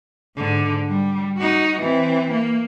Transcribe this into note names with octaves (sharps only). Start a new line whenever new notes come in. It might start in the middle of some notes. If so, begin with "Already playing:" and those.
G#2 D3
G3
D#4 F#4
E3 C4
A#3